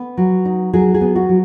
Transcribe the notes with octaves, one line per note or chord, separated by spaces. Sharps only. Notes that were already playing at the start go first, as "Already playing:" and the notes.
Already playing: B3 B4
F#3
D#4
F#3 G#4
G#4
B3
F#4
F#3